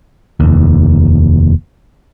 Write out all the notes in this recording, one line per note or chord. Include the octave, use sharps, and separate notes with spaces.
F1 D#2